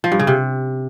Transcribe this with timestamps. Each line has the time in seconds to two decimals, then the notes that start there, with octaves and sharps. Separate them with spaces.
0.04 F3
0.12 G2
0.19 C#3
0.27 C3